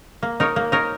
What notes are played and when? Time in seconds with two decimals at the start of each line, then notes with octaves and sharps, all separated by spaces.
0.23 A#3
0.40 D#4 A#4 C#5
0.56 A#3
0.72 D#4 A#4 C#5